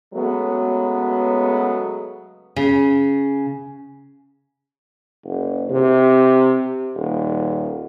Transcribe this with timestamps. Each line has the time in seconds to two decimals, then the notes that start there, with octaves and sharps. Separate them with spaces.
0.13 C#3 F#3 G#3 A3 B3
2.56 C#3
5.24 F#1
5.70 C3
6.96 D#1